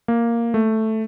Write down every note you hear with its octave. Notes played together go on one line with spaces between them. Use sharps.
A#3
A3